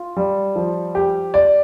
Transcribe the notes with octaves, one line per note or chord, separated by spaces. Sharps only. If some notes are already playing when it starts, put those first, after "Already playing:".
Already playing: F4
G3
F3
G4
D5